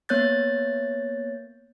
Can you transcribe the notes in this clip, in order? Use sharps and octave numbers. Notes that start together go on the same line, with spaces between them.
A#3 B3 C#5 F#6 G6 A6